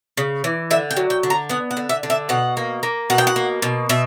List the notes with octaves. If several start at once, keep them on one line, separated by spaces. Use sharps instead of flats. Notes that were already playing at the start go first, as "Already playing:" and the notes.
C#3
E3
D3 E5
G5
F#3
G5
D3
A#5
B3 F#5
F#5
D3
E5
D3
E5
B2 F#5
A#3
A#3
B2 F#5
G5
F#5
A#3
B2
B2 E5